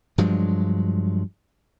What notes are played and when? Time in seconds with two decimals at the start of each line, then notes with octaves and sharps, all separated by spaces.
0.18 G2 F3 F#3 G#3